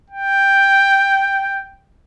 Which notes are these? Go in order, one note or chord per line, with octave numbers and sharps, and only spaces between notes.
G5